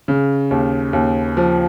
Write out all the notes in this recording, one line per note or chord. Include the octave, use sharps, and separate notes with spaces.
C#3
D#2
D#2
F3